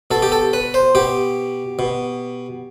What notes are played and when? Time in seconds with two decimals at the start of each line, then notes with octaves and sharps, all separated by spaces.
0.11 B2 A4
0.22 G4
0.32 A4
0.53 B4
0.74 C5
0.95 B2 G4
1.79 B2